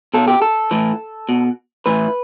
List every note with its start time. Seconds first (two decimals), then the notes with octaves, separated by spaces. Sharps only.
0.14 B2 A4
0.28 G4
0.42 A4
0.71 A2 E3
1.29 B2
1.86 A2 E3 B4